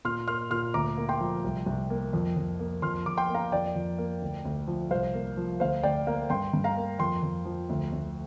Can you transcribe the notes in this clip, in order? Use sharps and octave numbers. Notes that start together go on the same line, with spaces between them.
A#2 C6 F6
A#3 C6 F6
A#2 C6 F6
D2 A#5 D6
A#3
G5 C6
F3
C2
C2
A#3
F2
F2
A#3
F2 C6 F6
F2 D6
G5 C6
A#3
F5 A#5
F2 D5 G5
F2
A#3
D2
D2
F3
C2 C5 F5
A#3
F3
D2 C5 F5
D2 D5 G5
A#3 F5 A#5
G2 G5 C6
G2
F5 A#5
A#3
F2 G5 C6
F2
F3
D2
D2